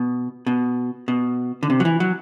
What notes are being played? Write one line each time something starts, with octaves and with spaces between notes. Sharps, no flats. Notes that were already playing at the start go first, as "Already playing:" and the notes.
Already playing: B2
B2
B2
D3
C3
F#3
E3
F#3